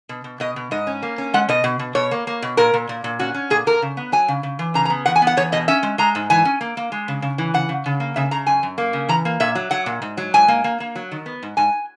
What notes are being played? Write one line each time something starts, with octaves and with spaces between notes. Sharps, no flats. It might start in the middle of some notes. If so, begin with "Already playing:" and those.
B2
B2
B2 D#5
B2
G#2 D#5
C#4
A#3
C#4
G#3 F#5
B2 D#5
B2
B2
B2 C#5
A#3
A#3
B2
A#2 A#4
A#2
A#2
A#2
C#4 F#4
C#4
A#2 G#4
A#2 A#4
C#3
B3
F#3 G#5
C#3
C#3
E3
C#3 A#5
A#5
B3
E2 F#5
G#5
B3
F#5
E2 C#5
B2 D#5
C#4 E5
G#3
G#3 A#5
G#2
E3 G#5
C#4
A#3
A#3
G#3
C#3
C#3
E3
C#3 F#5
C#3
C#3
A#3
C#3 E5
C#3 A#5
F#2 G#5
F#2
A#3
C#3
E3 A#5
A#3
A#2 E5
F#3
F#3 F#5
A#2
G#2
F#3
G#2 G#5
A#3
A#3
A#3
F#3
D#3
B3
G#2
G#2 G#5